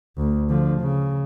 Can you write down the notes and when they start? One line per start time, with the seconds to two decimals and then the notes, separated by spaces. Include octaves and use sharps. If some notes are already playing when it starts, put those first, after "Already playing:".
0.18 D2
0.50 D3 F3
0.81 C#3